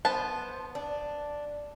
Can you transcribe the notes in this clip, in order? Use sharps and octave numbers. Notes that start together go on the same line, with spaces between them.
B3 C5 A5
D4